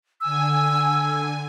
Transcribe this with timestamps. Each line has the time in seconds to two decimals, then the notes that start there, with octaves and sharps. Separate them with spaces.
0.21 D3 G#5 E6